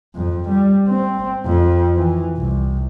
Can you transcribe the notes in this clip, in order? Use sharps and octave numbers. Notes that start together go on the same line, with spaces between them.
F2
G3
C4
F2
E3
C2